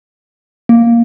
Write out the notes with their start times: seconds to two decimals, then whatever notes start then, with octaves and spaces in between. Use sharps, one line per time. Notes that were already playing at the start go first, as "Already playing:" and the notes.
0.69 A#3